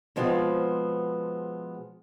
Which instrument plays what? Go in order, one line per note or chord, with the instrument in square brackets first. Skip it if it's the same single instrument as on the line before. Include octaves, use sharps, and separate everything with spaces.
[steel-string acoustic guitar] B2 F3 G#3 B3 C4